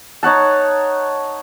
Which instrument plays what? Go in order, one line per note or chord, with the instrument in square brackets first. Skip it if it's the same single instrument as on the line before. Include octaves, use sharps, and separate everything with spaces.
[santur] D#4 C#5 F#5 A5